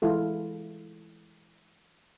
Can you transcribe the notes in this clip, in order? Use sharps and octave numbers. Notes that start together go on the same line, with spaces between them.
E3 G#3 E4 F4 A4